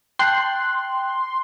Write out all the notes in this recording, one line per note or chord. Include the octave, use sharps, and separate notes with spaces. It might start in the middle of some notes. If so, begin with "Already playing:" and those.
G5 A5 C6 F#6